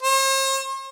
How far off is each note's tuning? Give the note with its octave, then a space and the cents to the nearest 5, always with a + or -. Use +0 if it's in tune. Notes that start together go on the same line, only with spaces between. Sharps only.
C5 +45